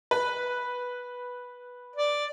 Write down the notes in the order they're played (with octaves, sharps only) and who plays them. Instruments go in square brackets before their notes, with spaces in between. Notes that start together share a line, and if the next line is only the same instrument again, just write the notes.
[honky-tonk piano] B4
[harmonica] D5